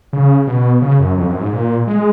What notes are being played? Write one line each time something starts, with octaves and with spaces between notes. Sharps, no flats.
C#3
B2
C#3
F#2
F2
F#2
G#2
A#2
G#3